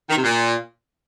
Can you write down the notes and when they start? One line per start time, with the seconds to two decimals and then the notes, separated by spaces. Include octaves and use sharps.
0.09 D#3
0.17 C3
0.24 A#2